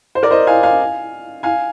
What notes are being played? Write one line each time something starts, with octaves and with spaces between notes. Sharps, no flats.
C5
A#4 D5
C5 D#5
F5 G#5
F5 G#5
F5 G#5